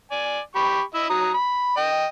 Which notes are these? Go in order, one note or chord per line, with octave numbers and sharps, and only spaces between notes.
D5 G#5
G4 B5 C#6
E4 D#5 E6
F#3 A#5 D#6
B5
D#5 G5